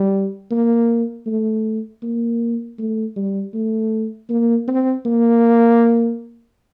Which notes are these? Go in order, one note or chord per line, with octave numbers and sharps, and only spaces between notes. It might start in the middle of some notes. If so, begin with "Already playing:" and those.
Already playing: G3
A#3
A3
A#3
A3
G3
A3
A#3
C4
A#3